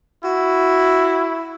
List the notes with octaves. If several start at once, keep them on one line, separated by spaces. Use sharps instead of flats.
E4 F#4